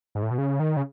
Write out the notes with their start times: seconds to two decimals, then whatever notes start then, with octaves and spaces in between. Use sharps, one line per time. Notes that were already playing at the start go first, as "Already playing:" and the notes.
0.15 G#2
0.22 A2
0.31 B2
0.38 C#3
0.60 D#3
0.77 C#3